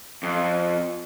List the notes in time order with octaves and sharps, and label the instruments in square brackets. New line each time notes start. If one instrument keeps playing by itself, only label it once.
[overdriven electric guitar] F2